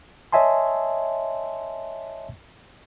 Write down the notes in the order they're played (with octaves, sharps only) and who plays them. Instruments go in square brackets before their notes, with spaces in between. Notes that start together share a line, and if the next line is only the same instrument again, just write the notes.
[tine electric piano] C#5 D#5 E5 G#5 A5 C6